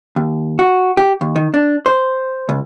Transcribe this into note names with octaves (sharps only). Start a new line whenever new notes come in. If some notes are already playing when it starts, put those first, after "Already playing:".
D#2
F#4
G4
D#2
D#3
D4
C5
C#2